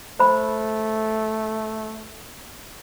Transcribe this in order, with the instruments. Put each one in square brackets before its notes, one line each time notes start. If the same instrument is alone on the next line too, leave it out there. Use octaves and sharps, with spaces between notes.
[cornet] A3 [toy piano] C5 B5